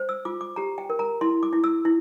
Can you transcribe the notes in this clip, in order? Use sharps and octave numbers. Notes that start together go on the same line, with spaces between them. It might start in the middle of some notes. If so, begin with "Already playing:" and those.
Already playing: C5
E6
F4 D6
D6
G4 A#5
G5
A#4
A#5
E4 C6
D6
E4
E6
E4